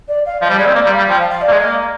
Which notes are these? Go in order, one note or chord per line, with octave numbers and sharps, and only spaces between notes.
D5
F5
F3 D#5
G3
G#3 D5
C4
A#3 D5
G3
F5
G3
F3 G5
F5
F5
D5
A#3
G#3
D#5
A#3